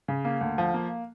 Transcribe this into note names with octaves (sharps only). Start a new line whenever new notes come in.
C#3
A#3
D2
F3
A#3